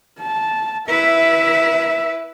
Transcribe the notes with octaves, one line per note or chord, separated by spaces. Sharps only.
A5
E4 B4 E5